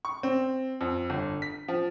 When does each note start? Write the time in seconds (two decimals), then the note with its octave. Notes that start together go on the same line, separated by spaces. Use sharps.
0.05 C#6
0.23 C4
0.81 F2
1.10 G1
1.42 B6
1.68 F3